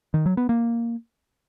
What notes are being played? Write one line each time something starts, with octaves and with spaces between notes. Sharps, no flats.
D#3
F#3
B3
A#3